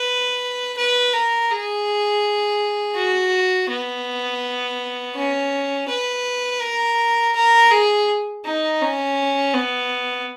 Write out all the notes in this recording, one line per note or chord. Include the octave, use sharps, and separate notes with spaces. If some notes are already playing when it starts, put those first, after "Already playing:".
Already playing: B4
B4
A#4
G#4
F#4
B3
C#4
B4
A#4
A#4
G#4
D#4
C#4
B3